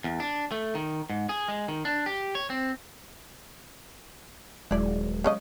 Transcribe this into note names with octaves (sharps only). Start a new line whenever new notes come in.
E2
D4
A3
D#3
G#2
G#4
G#3
D#3
D4
G4
C#5
C4
D#1 F#3 G#3 E4 D5
C#3 C#4 D#5